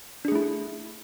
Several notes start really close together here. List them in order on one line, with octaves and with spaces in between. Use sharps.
D4 G#4 A3 E4